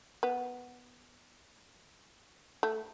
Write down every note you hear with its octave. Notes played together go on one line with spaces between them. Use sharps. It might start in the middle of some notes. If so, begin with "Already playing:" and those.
B3
A3